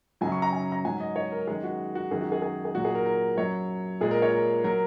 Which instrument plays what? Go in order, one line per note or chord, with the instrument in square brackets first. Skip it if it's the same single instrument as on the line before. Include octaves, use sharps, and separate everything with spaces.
[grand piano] F#2 C#3 F#3 G#5
C#6
A#5
G#5
A#5
G#2 F#3 G#5
D#5
C#5
A#4
F#2 D#3 G#3 G#4
F#4
F#4
F#2 D#3 G#3 G#4
F#4
G#4
G#4
G#4
A#2 F#3 F#4
G#4
A#4
A#4
F#2 F#3 C#5
A#2 G#3 G#4
A#4
C#5
A#4
F#3 A#4